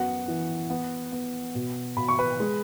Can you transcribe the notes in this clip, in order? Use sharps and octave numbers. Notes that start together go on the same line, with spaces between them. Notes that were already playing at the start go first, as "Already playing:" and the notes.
Already playing: F#2 B3 F#4 F#5
E3
B3
B3
B2
B2 B5
C#6
B4 B5
G#3